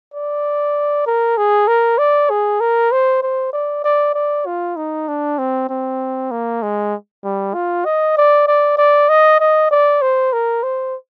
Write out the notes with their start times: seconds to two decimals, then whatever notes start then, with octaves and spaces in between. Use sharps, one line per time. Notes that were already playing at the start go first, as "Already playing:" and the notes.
0.14 D5
1.06 A#4
1.38 G#4
1.68 A#4
1.98 D5
2.30 G#4
2.60 A#4
2.91 C5
3.23 C5
3.53 D5
3.84 D5
4.14 D5
4.46 F4
4.77 D#4
5.08 D4
5.38 C4
5.69 C4
6.31 A#3
6.62 G#3
7.24 G3
7.54 F4
7.85 D#5
8.17 D5
8.47 D5
8.78 D5
9.09 D#5
9.40 D#5
9.71 D5
10.02 C5
10.33 A#4
10.63 C5